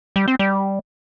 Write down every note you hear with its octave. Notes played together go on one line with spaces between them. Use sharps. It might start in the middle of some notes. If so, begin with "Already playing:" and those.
G3
C4
G3